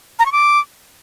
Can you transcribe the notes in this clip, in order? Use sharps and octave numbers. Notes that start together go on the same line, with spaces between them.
A#5
C#6
D6